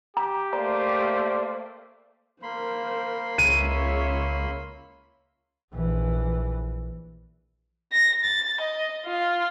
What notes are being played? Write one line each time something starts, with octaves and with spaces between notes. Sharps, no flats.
G4 A#5
A3 A#3 C5 D5 A#5
A#3 A#4 C5 B5 C6
C#2 C#5 E5 D#7
A#1 E3
A#6
A6
D#5
F4